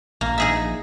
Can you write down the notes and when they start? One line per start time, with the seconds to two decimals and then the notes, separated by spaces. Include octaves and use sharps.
0.21 A#1 A#3
0.38 D#4 G#4 E5